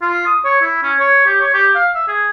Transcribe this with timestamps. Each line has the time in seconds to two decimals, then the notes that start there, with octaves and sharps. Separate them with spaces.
0.02 F4
0.26 D#6
0.45 C#5
0.62 E4
0.83 C#4
1.00 C#5
1.26 G4
1.41 C#5
1.54 G4
1.75 F5
1.95 E5
2.08 G#4